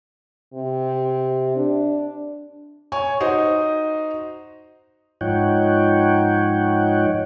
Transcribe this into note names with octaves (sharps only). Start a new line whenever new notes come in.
C3
D4
C#5 G#5 C#6
D#4 F#4 C5 D#5
G#2 F3 D#4 C#5 F#5 G5